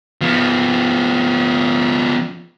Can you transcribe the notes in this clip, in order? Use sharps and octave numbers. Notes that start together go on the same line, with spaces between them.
F3 B3